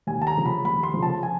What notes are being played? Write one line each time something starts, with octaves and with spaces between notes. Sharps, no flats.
D#2 G#5
A5
A#5
C#3 F3
B5
D#2 B5
C6
C#3 F3
A5
G#5